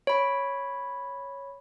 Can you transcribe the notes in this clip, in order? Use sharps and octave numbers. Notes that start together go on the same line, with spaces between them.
C#5 B5